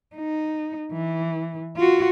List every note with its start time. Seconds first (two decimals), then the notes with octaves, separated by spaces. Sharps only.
0.16 D#4
0.92 E3
1.77 F4 F#4